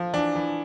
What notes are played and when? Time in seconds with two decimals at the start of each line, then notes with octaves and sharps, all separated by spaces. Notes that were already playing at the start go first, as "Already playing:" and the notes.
Already playing: F3
0.14 E3 D4
0.36 E3